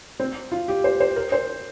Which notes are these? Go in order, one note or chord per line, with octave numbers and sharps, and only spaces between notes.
C4
F4
G4
C5
C5
A#4
C5